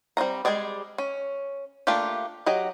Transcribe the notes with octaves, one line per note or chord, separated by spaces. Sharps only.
G3 C4 C#4 A#5
G3 G#3 G4 G#4 D5
C#4
A3 A#3 D4 F4 G4
F#3 G4 D#5